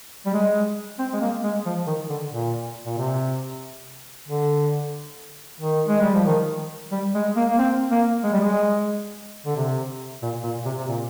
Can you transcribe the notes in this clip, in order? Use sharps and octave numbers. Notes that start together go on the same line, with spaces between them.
G3
G#3
C4
G#3
A#3
G#3
F3
D#3
D3
A#2
A#2
C3
D3
D#3
G#3
G3
F3
D#3
G3
G#3
A#3
A#3
C4
A#3
G#3
G3
G#3
D3
C3
A#2
A#2
C3
C3
A#2